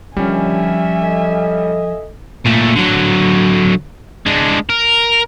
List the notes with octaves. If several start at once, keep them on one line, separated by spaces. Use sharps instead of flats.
D#2 D3 F3 G3 C#4 E5 G#5
A4 D#5
A#2 A3
D3 F#3
G#3 D4
A#4